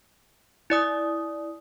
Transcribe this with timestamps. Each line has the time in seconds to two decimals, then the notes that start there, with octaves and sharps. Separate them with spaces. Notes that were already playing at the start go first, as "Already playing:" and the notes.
0.70 E4 D5 D#6